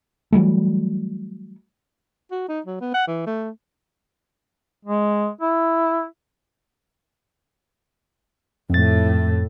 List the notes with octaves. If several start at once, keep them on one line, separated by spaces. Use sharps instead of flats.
E3 F#3 G3 A3
F#4
D#4
F#3
B3
F#5
E3
A3
G#3
E4
F2 A2 A3 A6